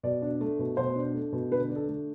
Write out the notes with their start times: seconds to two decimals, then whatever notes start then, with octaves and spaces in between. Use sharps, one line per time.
0.03 B2 D5
0.22 D4
0.41 A3
0.59 B2
0.77 B2 C5
0.96 D4
1.14 A3
1.33 B2
1.51 D3 B4
1.70 D4
1.76 A4
1.88 A3